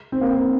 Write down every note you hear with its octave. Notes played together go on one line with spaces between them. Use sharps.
C4
A#3
C4